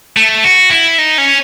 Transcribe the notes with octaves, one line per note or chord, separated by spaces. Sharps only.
A3
F#4
E4
D#4
C#4